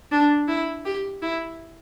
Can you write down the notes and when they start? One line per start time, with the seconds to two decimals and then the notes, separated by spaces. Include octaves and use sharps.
0.11 D4
0.48 E4
0.85 G4
1.22 E4